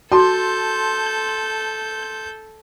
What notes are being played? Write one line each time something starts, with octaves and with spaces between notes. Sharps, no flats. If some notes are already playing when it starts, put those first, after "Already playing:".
F#4 A4 A5 C6 G6